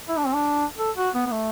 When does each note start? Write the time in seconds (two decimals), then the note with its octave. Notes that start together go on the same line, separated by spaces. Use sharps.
0.09 E4
0.17 D4
0.26 C4
0.34 D4
0.78 A4
0.97 F#4
1.15 B3
1.26 B3
1.32 A3